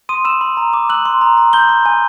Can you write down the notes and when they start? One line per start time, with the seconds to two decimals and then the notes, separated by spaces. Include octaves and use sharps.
0.09 C6 D#6 D#7
0.25 B5 E6 E7
0.41 B5
0.57 A#5
0.73 D6
0.89 E6 F#6 F#7
1.05 C6
1.21 A#5
1.37 A#5
1.53 B5 G6 G7
1.69 B5
1.86 G#5